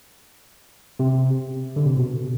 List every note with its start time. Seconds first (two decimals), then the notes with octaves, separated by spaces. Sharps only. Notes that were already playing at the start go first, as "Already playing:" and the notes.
1.00 C3
1.76 D3
1.86 C3
1.97 B2